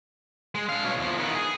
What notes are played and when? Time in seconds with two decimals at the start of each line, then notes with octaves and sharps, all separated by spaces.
0.55 G#3
0.69 D4 F5
0.84 B2 C#5
0.98 E2 F3
1.18 D#3 B3
1.35 G#4